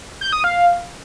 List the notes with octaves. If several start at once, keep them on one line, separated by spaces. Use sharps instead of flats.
G6
D#6
F5